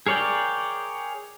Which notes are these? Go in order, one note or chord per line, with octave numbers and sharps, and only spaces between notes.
G#4 A#4 C#5 D5 G5